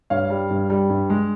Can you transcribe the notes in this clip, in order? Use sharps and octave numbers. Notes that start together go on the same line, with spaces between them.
G2 C#5 F5
G3
G2
G3
G2
G#3